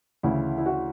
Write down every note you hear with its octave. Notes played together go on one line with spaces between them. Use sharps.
D2 C#3 E3 E4
E4
F#4